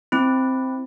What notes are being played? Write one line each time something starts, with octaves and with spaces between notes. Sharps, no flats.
C4 E4